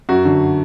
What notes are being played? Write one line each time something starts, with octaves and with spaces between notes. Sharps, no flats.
F#2 F#4
D3